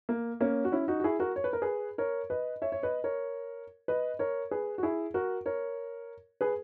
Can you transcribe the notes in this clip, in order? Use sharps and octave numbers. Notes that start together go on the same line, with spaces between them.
A#3
A#3 C#4
F#4
C#4 E4
D#4 F#4
F#4
E4 G#4
F#4 A#4
C#5
B4
A#4
G#4 B4
A#4 C#5
B4 D#5
C#5 E5
C#5
B4 D#5
A#4 C#5
B4 D#5
A#4 C#5
G#4 B4
F#4
E4 G#4
F#4 A#4
A#4 C#5
G#4 B4